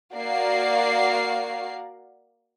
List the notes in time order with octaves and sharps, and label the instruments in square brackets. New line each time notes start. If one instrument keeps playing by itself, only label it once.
[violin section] A#3 F#4 A#4 D5 F5 C7